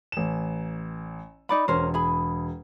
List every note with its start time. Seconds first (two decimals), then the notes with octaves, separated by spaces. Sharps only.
0.12 A1 E7
1.49 D#4 D5 B5
1.68 E1 C#4 A#4 C5
1.94 G#4 B5